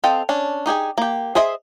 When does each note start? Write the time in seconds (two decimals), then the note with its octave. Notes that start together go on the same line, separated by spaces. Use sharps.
0.04 C4 A4 D#5 F5 G5
0.29 C#4 D4
0.66 D#4 G4 G#4 G#5
0.98 A#3 G4
1.35 G#4 C5 D#5 E5